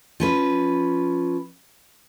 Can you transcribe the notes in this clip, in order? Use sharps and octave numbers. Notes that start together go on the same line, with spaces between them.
F3 C#4 B4